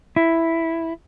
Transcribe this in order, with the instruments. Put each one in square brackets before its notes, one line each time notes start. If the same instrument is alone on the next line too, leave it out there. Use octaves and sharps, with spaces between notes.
[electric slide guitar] E4